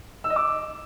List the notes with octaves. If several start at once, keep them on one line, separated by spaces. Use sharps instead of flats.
E6
D#5
D6